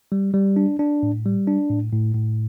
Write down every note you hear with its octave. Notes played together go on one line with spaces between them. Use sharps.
G3
G3
D4
D4
A2
G3
D4
A2
A2
A2